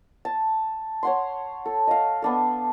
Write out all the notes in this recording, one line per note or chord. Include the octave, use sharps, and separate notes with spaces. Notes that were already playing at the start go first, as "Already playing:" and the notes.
A5
C#5 F#5 C6
A4
D#5 F5
B3 D4 A4